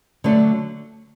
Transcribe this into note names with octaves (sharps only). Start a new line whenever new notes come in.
D3 F#3 A3 D4